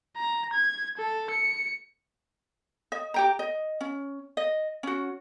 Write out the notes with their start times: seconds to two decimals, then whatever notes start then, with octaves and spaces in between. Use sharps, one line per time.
0.17 A#5
0.53 G#6
0.98 A4
1.30 C#7
2.92 D#5
3.14 G4 G5 A#5
3.39 D#5
3.81 C#4
4.37 D#5
4.83 C#4 F#4